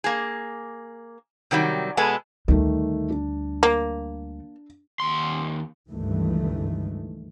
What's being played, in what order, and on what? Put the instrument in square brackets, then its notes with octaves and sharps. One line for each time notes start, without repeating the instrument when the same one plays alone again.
[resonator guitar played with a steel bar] A#3 G#4
C3 D#3 F#3 G3
B2 G#3 B3 G#4 A4
[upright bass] D2 G3 [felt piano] D#3 A3
[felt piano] D4
[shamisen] A#3
[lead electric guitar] D#2 C6
[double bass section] C#2 G2 D#3 E3 A3